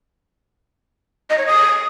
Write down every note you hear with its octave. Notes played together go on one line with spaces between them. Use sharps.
D#5
C#5
D#6